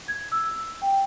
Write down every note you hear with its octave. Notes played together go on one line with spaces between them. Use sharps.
G#6
E6
G5